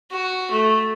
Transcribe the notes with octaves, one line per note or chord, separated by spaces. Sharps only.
F#4
A3